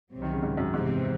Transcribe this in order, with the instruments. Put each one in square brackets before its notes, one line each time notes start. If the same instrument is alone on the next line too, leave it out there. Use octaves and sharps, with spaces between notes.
[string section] C2 C3 F#3
[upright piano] D#3
C#3
G#2
F#2
[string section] E2 C3 E3 C4 [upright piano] G#2